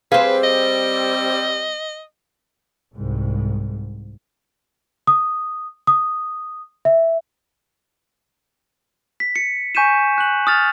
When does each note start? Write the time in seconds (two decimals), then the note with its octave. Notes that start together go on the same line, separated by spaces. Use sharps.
0.12 G3 C4 G#4 B4 C5 F5
0.44 D#5
2.95 C2 G#2
5.07 D#6
5.87 D#6
6.85 E5
9.20 B6
9.36 C#7
9.75 G#5 C#6 G6 B6 D#7 E7
10.18 F#6 F#7
10.47 D#6 F6 A6 F7